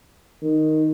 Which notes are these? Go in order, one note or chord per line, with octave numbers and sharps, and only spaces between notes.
D#3